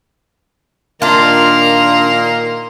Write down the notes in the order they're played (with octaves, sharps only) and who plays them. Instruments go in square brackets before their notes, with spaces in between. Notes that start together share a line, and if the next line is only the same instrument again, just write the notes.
[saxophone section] A#2 D#3 A#3 [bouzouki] D4 F4 [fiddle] A#5 C6